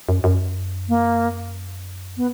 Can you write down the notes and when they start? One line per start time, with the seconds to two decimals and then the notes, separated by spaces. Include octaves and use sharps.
0.09 F#2
0.24 F#2
0.89 A#3
2.17 B3